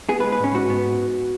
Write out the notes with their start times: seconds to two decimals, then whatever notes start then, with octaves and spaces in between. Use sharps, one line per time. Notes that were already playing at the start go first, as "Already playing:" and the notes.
0.09 B3 G#4
0.20 B4
0.24 G#3
0.32 B4
0.40 G#2 C#4
0.55 G#2 F#4
0.70 B3